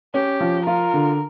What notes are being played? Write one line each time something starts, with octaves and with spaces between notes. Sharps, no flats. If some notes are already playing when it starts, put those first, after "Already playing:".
C#4 G4
F3
F4 A#4
D3